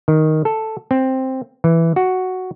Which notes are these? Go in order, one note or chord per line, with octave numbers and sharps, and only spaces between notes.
D#3
A4
C4
E3
F#4